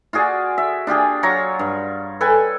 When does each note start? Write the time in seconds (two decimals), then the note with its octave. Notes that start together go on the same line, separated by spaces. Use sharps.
0.13 F4 F#4 G#4 D5
0.58 E5
0.87 D4 F4 G4 G#4
1.23 F#3 F4 C#5 A#5
1.59 G2
2.21 A4 B4 G5 G#5